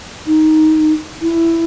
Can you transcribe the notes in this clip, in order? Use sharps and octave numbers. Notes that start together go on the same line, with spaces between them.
D#4
E4